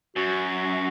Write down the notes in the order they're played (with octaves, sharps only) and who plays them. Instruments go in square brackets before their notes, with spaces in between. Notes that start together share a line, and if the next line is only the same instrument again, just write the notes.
[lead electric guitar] F#2 [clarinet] F#4